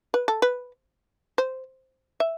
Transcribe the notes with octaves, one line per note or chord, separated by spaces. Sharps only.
B4
A4
B4
C5
E5